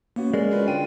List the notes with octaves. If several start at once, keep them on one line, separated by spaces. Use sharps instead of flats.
A#3 B3 C#4 F#4
G#3 A#4 D5
C#4 F4 B4
D3 F4 G5 D#7